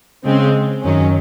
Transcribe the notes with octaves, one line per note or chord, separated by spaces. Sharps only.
C#3 G#3 C4
F#2 D#3 F#3 C#4